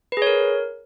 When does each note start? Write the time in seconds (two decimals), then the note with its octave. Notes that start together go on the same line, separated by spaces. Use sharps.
0.12 B4
0.17 G#4
0.22 C#5
0.27 A#4